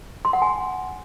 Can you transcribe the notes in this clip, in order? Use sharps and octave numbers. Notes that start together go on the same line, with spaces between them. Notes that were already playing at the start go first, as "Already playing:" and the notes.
C6
F#5
G#5